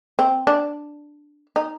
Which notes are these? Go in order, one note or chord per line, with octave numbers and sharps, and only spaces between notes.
C4
D4
D#4